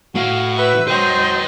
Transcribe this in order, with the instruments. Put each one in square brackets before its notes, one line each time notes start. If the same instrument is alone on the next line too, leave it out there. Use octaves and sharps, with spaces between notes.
[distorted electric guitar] A2 [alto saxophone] F#4 [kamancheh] F5
[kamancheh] B4 E5
[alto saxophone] F#3 [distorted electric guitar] B4 G5 [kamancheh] C5 D#5